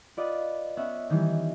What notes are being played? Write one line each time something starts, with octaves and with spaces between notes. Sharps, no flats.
F4 B4 D5 D#5 F#5
B3 C#4 E5 F#5
D#3 E3 G3